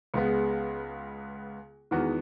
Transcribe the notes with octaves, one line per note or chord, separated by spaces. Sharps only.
C#2 C#3 G#3 B3
E2 D#3 G#3 B3 F#4